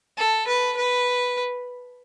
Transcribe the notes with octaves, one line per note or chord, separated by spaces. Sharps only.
A4
B4
B4